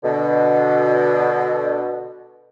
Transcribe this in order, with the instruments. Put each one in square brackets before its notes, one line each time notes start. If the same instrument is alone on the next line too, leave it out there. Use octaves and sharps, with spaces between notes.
[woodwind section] B2 D3